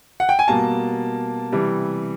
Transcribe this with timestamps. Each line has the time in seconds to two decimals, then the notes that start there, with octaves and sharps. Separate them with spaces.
0.20 F#5
0.29 G5
0.39 G#5
0.48 B2 G3 A#3 A5
1.52 C3 E3 G3